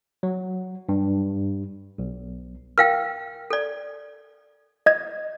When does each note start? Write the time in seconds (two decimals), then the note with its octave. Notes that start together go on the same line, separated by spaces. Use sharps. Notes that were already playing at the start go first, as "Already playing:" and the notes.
0.23 F#3
0.89 G2
1.98 B1
2.78 A#4 F5 G5 F6 A#6
3.50 A4 D5
4.86 D#5 G#6